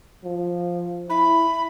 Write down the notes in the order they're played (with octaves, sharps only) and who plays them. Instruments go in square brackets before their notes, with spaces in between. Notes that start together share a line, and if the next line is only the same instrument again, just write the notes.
[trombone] F3
[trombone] E4 [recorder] B5